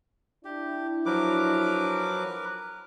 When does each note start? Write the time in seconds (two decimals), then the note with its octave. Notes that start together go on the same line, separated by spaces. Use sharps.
0.45 D4 E4 G4
1.06 F3 F#3 A#4 B4 D6